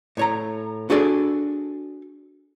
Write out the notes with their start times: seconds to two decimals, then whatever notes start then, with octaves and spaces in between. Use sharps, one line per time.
0.17 A2 C#5 A#5
0.90 D4 F#4 G#4 A4 D5